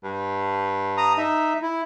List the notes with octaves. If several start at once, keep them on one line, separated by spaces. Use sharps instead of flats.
G2
A#5 D#6
D#4 E5
E4